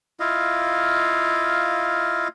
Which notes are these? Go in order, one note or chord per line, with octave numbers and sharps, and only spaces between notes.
E4 F4 D#5 F5